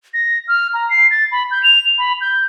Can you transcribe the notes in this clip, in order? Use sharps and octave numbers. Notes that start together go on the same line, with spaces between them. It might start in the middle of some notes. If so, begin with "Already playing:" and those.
A#6
F6
A#5
C7
A6
B5
G6
F7
B5
G6